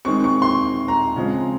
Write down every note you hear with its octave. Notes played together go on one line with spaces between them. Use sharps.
D#3 G#3 C4 C#6
C#6
C6
A#5
C#3 F3 G#3 C4